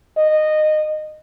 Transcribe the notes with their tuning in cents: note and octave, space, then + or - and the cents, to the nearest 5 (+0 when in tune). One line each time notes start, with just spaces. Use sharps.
D#5 -15